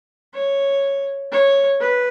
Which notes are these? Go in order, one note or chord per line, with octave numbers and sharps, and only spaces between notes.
C#5
C#5
B4